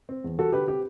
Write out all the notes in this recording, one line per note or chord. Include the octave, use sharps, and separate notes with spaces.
C4
E2
G3 F#4 A4
D3 G4 B4
C4 G4